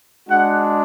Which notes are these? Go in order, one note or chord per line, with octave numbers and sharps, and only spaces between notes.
G#3 D4 F#4 F#5